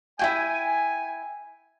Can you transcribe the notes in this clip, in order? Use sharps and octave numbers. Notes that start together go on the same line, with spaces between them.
E4 F#4 G5 G#5